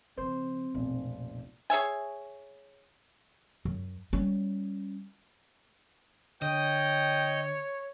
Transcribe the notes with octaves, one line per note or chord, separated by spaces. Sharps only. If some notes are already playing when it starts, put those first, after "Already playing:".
C#3 F3 C4 C5
F1 B1 A#2 F3
G#4 C#5 E5 G#5
F#2
G3 C#4
D3 C#5 D#5 G5